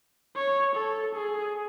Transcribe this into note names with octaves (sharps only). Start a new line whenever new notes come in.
C#5
A4
G#4